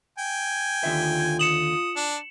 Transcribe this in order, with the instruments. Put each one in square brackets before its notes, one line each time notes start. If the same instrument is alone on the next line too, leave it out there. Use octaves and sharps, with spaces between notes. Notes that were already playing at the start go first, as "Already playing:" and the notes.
[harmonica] G5 G#5
[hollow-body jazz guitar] D#2 D3 E5 [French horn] F4
[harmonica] D#6 [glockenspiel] C#7 E7 F#7
[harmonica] D4